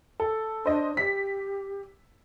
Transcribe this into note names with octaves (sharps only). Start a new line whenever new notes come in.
A4
D4 C5 D#5
G4 B6